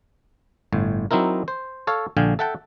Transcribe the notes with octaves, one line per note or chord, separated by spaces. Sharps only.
G1 A2
F#3 C4 D#4 E4 A#4
C5
A4 C#5 F5
A#1 D3 F5 G5 G#5
A4 E5 F#5 G5 A5